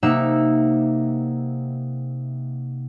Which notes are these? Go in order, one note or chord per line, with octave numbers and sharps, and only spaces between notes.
C3 A#3 D#4 E5 F#5 E6